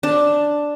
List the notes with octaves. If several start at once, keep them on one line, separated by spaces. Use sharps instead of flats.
D4